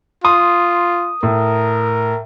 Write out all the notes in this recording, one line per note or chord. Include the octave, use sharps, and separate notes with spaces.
F4 C6 D#6
A2 A#4